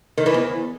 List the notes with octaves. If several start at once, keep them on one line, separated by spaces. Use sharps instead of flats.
D#3
E3
E2